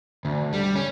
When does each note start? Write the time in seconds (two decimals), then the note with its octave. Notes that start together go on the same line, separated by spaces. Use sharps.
0.25 D2
0.53 G3
0.76 C#4